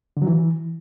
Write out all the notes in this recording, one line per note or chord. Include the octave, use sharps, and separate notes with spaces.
D3
F#3
E3